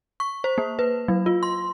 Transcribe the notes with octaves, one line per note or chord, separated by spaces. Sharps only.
C#6
C5
A#3
B4
F#3
F4
C6